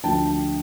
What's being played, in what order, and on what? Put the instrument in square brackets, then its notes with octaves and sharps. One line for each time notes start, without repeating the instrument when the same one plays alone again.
[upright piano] D2 D3 F3 G5 A5